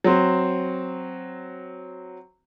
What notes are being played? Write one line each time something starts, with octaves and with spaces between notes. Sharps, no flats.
F#3 C4